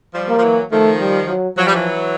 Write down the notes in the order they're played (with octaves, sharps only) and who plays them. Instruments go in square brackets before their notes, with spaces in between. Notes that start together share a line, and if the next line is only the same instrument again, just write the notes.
[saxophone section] F3 G3
[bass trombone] A#3
[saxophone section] F3
E3 F#3
[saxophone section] D#3 F3 [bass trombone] A3
[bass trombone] G3
F#3
[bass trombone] F3 [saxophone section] F#3
[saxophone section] G3
E3 F#3